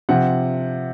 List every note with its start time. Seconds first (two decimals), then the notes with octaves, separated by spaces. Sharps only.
0.09 C3 F3 F#5